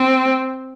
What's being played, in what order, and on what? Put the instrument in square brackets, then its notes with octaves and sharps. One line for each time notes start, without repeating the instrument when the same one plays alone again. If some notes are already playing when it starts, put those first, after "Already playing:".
Already playing: [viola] C4